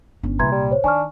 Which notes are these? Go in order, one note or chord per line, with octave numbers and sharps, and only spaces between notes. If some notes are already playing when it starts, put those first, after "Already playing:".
G1 C#4
C2 A#2 E3 A#5 C6 G#6
G3
C5 C#5
D#3 D4 G#5 C#6 F6